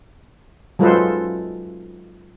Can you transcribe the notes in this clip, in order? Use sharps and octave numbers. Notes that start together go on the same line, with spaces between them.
F#3 G#3 F4 A4 B4 C5